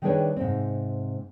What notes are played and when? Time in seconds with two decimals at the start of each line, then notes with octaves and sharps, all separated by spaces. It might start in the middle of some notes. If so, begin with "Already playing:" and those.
0.02 D#3 G3 D4 G#4 B4 C#5
0.36 G#2 C3 C4